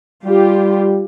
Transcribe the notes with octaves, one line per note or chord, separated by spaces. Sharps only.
G3 F4 G4